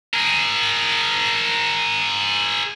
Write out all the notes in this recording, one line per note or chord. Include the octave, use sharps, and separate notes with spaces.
G#4 A#4